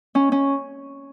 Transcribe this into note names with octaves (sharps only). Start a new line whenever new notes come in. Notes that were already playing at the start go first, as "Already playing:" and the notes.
C#4
C#4